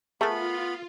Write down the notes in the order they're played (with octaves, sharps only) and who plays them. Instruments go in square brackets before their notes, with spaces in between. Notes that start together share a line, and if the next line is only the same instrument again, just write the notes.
[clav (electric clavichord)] A3 [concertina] B3 B5 [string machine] F4 [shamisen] G#4 A#4